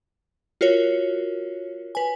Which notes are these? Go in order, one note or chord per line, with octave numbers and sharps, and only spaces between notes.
F4 F#4 A#4 C#5
B4 G#5